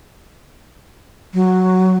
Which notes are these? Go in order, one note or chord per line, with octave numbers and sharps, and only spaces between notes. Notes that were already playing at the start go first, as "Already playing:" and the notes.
F#3